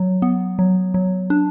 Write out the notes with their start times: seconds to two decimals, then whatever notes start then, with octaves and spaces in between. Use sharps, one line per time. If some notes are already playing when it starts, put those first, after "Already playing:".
Already playing: F#3
0.22 B3
0.59 F#3
0.94 F#3
1.30 D4